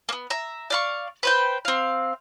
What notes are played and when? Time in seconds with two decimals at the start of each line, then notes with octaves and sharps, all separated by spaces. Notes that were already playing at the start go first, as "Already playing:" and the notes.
0.09 A#3 B3
0.30 E5 A#5
0.70 D5 F5 C#6
1.23 B4 C5 G5
1.65 C4 F5